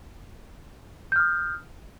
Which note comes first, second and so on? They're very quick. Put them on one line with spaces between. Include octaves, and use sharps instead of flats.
G6 F6 D#6